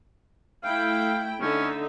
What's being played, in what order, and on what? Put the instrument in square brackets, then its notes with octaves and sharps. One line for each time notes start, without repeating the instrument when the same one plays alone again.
[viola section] A3 E4 G5 [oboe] F5
[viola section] D3 D#4 E5 [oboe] C#4